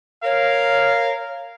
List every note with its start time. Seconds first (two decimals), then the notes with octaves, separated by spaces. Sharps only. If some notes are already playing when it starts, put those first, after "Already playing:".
0.24 A#4 C#5 F5